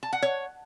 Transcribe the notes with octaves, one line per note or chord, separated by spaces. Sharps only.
A5
F#5
C#5